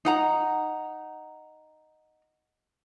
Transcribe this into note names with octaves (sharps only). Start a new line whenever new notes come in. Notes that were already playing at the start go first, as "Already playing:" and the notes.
D#4 F#5 A#5